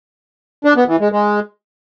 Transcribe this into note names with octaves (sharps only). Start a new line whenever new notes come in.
D4
B3
E3
G#3
G#3